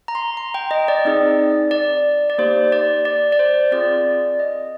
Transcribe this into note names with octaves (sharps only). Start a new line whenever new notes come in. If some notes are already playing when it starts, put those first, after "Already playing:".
A#5
C6
A#5
G5
D#5
D5
C4 D#4 G#4
D5
D5
A#3 D#4 G4 C5
D5
D5
D5
C5
C4 F4 G#4 D5
D#5